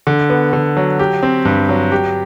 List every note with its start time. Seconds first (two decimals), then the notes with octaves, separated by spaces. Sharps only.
0.07 D3
0.30 B3
0.53 D3
0.77 F#3
0.99 G4
1.23 C4
1.45 G2
1.69 F#3
1.92 G4